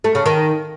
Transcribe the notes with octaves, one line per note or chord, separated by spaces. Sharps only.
A3
C#3
D#3